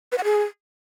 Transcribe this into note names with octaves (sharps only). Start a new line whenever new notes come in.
B4
F#5
G#4